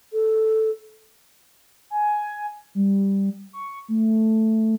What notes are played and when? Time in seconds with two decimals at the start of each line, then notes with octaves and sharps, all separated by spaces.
0.13 A4
1.90 G#5
2.75 G3
3.53 C#6
3.88 A3